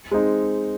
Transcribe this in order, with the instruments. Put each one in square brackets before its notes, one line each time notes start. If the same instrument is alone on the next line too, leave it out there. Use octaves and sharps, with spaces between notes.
[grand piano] G#3 C4 D#4